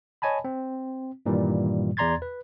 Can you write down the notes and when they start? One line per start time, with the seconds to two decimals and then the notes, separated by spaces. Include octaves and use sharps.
0.22 C#5 D#5 G#5 A5 B5
0.44 C4
1.26 G2 A#2 D#3 E3 G3
1.97 E2 D5 A#5 C6 G#6 A6
2.22 B4